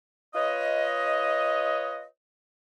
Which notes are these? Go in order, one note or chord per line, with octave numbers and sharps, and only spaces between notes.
F4 B4 C#5 D#5